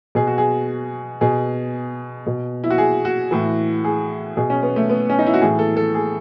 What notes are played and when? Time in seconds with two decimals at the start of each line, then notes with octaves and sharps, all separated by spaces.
0.15 B2 G#4
0.27 F#4
0.38 G#4
1.21 B2 G#4
2.27 B2
2.64 E4
2.70 F#4
2.78 G#4
3.05 F#4
3.31 A2 E3
3.84 G#4
4.37 B2 G#4
4.50 C#4
4.63 B3
4.76 A3
4.90 B3
5.10 C#4
5.19 D#4
5.26 E4
5.34 F#4
5.41 A2 E3 G#4
5.59 A4
5.77 A4
5.94 G#4